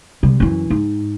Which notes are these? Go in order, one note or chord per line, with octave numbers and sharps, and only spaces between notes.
C3 G3
F#2 E3
G#2